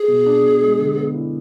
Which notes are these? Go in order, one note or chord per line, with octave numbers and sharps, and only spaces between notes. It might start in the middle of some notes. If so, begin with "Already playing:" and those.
Already playing: G#4
B2
D4
B2
G#3
D3
B3
E4